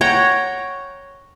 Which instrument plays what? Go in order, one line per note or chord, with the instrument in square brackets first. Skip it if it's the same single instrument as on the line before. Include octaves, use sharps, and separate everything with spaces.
[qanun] C#5 F#5 G5 A#5